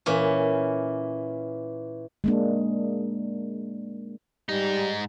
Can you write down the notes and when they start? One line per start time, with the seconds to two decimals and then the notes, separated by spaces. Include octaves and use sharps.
0.06 A#2 E3 C#4
2.24 G#3 A#3 D4
4.49 G#2 G3 D#4